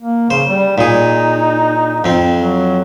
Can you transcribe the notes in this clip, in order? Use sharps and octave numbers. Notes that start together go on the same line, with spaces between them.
A#3
C#3 C5
G3
A#2 D#4 G#4
F2 C4
F#3